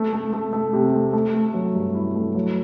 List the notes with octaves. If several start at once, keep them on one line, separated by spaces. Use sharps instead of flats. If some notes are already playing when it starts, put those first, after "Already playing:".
Already playing: A3
A3
A3
A3
C3
A3
A3
A3
F#3
G2
E4
A3
F#3